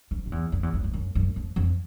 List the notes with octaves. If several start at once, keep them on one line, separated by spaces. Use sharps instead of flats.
F2
F2
E2
F2
E2
F2
F2
F#2
F#2
F2
F2